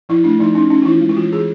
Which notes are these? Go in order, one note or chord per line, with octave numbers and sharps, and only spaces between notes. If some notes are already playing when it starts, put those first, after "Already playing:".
F3 E4
A3 D4
F3 D#4
C#4 D#4
C#4 D#4
F4
E3 E4
G#3
F4
E3 F#4
E3 G#4